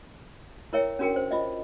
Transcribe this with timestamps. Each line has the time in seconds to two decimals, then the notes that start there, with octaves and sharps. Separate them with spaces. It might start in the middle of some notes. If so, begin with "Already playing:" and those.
0.73 E4 A#4 C#5 E5 G5
0.99 C#4 D4 F#4 G#4 A#4 G5
1.16 C5
1.31 F4 D#5 E5